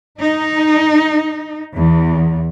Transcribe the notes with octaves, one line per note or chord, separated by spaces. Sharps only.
D#4
E2